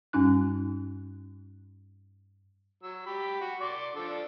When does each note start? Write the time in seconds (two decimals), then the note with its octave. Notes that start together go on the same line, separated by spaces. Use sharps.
0.13 G2 G3 C#4 D#4 F#6
2.83 F#3 E6
3.06 G4 B5
3.41 F#4
3.61 D5 C6 D6
3.96 F3 D4 A4